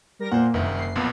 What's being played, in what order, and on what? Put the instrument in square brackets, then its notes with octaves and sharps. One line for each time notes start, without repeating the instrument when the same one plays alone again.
[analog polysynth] G3 A#4 A#6
[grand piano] A#2 [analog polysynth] A#3 [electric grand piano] C5 F#5
[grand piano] F#1 [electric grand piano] C2 D#3
[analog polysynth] C7
[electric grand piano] B1 F2 A#2 [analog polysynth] B3